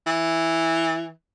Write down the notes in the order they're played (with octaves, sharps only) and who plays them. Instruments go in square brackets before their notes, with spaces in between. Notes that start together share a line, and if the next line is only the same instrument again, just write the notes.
[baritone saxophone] E3